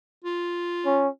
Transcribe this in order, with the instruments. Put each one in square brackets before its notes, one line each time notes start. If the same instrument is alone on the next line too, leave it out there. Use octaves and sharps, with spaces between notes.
[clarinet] F4
[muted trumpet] C#4